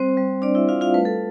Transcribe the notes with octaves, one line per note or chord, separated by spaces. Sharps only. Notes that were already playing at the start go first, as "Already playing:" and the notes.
Already playing: G3 C4 C5
G3
G3 D4 D5
E4 E5
G3 F4 F5
F4 F5
A3 B4
A4